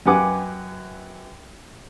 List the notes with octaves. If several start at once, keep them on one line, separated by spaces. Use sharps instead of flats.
F#2 G4 B4 F#5 G#5 D6